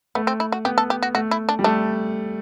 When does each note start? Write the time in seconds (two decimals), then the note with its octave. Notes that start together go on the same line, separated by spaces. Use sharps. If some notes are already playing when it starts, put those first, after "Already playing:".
0.15 A3 B3
0.27 C4
0.40 E4
0.52 F#4
0.65 B3 G4
0.78 A4
0.90 G4
1.03 F#4
1.15 A3 F#4
1.31 E4
1.49 D4
1.59 G3
1.64 A3 D4